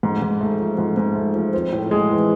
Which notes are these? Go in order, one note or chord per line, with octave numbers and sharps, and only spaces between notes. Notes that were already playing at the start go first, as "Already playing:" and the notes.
G#2
G#2
A3
F3
G#2
G#2
A3
F3
C4
A2
G#3
E3